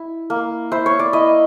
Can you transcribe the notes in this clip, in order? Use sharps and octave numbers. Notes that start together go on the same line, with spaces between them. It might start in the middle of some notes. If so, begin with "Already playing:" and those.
Already playing: E4
A#3
E4 C5
C#5
D5
E4 D#5